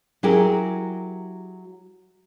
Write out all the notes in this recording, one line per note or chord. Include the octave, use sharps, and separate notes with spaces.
F#3 E4 G4 G#4 A#4